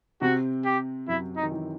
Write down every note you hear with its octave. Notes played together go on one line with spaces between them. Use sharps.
C3 C4 F#4
G4
F#2 F#3 E4
D#4
D#3
E3